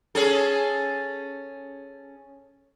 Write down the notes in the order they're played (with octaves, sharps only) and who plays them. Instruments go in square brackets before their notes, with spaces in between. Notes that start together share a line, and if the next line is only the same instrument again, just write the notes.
[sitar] C#4 G#4 A4